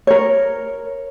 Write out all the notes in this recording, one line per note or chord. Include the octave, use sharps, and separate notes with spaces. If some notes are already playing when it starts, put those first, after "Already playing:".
A#4 C#5